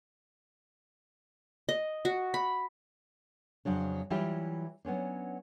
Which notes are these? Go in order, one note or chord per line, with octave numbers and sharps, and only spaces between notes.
D#5
F#4
B5
F2 C#3 F#3 D4
E3 F#3 G3 E4 F4 G4
F#3 B3 C#4 D4